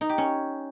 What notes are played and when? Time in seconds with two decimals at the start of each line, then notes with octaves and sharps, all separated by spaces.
0.01 D#4
0.09 G4
0.18 C#4